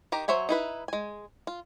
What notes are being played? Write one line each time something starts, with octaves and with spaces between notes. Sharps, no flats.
D#3 G4 A#5
F#3 C5 C#5 E5 G#5
D#4 E4 B4
G#3 G#5
F4